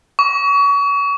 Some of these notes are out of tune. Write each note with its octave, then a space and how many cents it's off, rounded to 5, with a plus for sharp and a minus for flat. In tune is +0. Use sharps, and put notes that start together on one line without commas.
C#6 +35